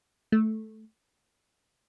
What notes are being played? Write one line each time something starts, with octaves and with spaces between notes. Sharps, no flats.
A3